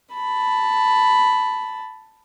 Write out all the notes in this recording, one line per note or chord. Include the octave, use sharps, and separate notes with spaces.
A5 B5